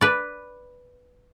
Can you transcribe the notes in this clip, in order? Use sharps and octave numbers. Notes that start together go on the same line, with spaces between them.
B4 D5